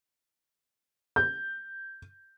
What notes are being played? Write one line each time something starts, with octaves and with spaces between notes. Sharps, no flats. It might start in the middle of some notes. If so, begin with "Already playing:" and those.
G6